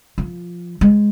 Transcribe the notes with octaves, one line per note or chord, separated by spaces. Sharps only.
F3
G#3